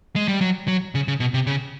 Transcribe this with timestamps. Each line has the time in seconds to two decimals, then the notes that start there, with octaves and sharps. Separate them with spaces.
0.16 G#3
0.28 G3
0.41 F#3
0.68 F#3
0.95 C#3
1.08 C#3
1.20 B2
1.34 C3
1.47 C#3